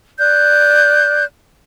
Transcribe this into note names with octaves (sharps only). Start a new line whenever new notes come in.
D5 F#6 G6